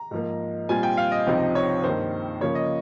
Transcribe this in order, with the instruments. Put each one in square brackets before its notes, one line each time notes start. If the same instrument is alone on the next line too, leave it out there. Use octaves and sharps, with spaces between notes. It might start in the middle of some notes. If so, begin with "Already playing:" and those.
Already playing: [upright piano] A#5
G#2 F3 A#3
A#2 G3 C4 F4 G#5
G5
F5
D#5
C#2 C3 F3 C4 D#4
C#5
G2 D#3 A#3 C5
C#3 F3 A#3 C#5
D#5